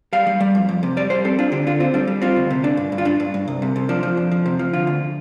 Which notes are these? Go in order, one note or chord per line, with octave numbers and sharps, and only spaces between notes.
G3 F5
G3
G3
F2
F2
C3
G3 D5
G3 C5
C4 A4
D4 F4
D3 G4
D3 F4
C4 F4
G3 D4
G3
C4 F4
D2
C3
D4
G2
G2
F4
G2 D4
G2
G2
C2
C3
C3
F3 D4
F3
F2
F3
C3
F3
D3 F4
D2